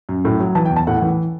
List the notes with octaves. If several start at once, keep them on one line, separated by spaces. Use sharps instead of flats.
F#2
A2
F#3
E3 A5
G5
E2
A5
A2 F#5
E3